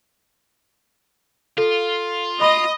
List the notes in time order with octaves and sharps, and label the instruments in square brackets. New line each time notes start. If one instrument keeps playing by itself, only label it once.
[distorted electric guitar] F4 [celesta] A4
[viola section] D#5 [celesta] B5